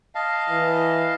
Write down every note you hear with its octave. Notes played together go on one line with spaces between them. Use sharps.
D#5 F5 A5
E3